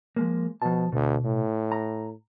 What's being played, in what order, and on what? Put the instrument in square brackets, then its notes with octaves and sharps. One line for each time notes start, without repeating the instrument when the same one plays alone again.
[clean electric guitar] F3 G#3 A#3
[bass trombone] B2 [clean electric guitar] F3 A5
[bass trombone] D2 [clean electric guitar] B2
[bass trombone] A2
[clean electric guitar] A#5